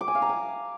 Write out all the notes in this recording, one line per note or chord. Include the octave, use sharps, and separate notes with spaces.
D6
G#5
F5
A#5
G#5